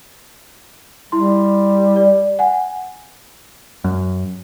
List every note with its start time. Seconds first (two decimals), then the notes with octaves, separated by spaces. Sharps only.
1.12 G3 E4 C6
1.96 D5
2.39 F#5 G#5
3.84 F#2